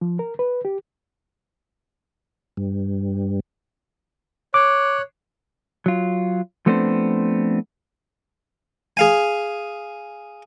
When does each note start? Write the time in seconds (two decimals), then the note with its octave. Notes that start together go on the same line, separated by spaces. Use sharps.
0.01 F3
0.19 A#4
0.39 B4
0.65 G4
2.57 G2
4.54 C#5 D6 F#6
5.86 F#3 F4
6.66 F3 A3 B3 C4 D4 C5
8.97 G#4 F5 G#5